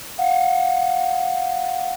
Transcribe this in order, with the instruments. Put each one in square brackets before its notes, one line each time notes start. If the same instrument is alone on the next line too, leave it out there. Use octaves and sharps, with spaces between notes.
[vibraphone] F5 F#5